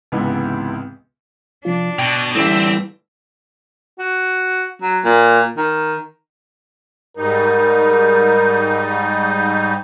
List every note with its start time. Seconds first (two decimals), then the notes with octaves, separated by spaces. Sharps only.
0.12 C#2 G#2 C3 E3 B3
1.65 C3 F3 D4 F4
1.99 B2 G5
2.35 A2 D3 E3 G3 C4 E5
3.99 F#4
4.82 F#3
5.05 A#2
5.57 D#3
7.17 G#2 G3 D#4 A#4